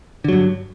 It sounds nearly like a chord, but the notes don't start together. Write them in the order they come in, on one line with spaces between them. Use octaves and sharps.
D3 F#3 G2